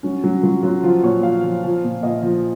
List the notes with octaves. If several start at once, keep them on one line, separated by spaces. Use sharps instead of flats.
F#3 C#4
F#3
F#3 F4
F#3 F4
F3 F4
A#2 C#5
F3 F5
F3
F3
A#2
A#2 D#5
F3